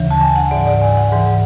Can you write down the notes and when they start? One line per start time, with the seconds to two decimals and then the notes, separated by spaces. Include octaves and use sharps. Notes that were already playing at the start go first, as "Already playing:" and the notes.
Already playing: D2 C#3 E3
0.11 A5
0.21 G#5
0.36 F#5
0.51 G#2 E3 D5
0.67 D5
0.82 G#5
0.97 F#5
1.12 G#2 E3